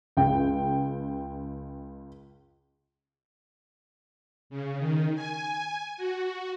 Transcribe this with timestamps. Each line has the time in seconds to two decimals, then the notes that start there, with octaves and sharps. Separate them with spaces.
0.17 C#2 G5
4.50 C#3
4.79 D#3
5.15 G#5
5.97 F#4